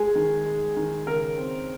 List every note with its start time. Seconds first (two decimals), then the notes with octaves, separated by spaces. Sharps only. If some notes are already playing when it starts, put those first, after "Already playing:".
Already playing: G#3 G#4
0.15 D#3
0.46 G#3
0.77 D#3
1.07 C#3 A#4
1.37 C4